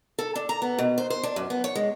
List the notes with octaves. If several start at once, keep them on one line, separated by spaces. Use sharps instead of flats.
A4
D4
A#5
B3
B2
C5
C5
D4
F#2
B3
C#5
G#3